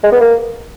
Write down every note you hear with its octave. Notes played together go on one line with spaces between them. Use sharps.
G#3
B3
A#3